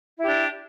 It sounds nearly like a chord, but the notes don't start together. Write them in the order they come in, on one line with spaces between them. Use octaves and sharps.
E4 G4 D4